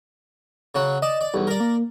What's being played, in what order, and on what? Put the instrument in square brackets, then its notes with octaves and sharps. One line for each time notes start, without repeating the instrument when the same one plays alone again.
[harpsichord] C#3 F#3 F#5
[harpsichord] D5 A5 [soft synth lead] D#5
[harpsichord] D5
[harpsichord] B1 E2 [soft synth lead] G3
[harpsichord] A#4 D5
[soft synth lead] A#3